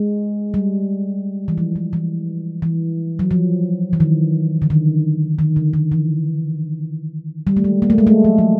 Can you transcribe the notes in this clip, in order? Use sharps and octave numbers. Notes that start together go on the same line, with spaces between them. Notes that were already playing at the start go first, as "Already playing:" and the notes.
Already playing: G#3
G3
E3
F3
E3
E3
E3
F#3
F3
E3
D#3
D3
D#3
D#3
D3
D#3
E3
G3
A3
G#3
A#3
A3
G#3
A3
F#3
F3